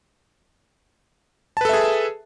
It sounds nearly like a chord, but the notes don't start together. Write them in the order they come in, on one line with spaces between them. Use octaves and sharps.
A5 B4 A4 E5 G#4